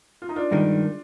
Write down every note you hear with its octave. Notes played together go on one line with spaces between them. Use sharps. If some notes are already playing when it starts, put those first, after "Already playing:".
F4
D#4
D4 F4
G2 D#3 G#3 D#4